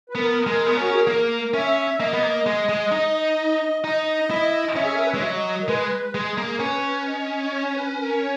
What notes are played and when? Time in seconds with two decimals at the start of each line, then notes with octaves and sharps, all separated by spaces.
0.09 B4
0.15 B3 A#4
0.47 G#3
0.66 B3
0.77 C#4 F#4
0.94 G#4
1.07 A#3 A#4
1.54 C#4 E5
2.00 A#3 D#5
2.13 B3
2.23 A#3
2.46 G#3
2.69 G#3
2.92 D#4
3.84 D#4 D#5
4.31 E4
4.76 C#4 E5
4.85 G#4
4.94 A#4
5.04 B4
5.13 G#3 C#5
5.22 F#3 D#5
5.63 A#4
5.68 G#3 B4
6.14 G#3 G#4
6.38 A#3
6.60 C#4 B4
7.07 D#5
7.46 D#5
7.53 C#5
7.65 C#5
7.76 B4
7.92 B4
7.98 A#4
8.21 C#5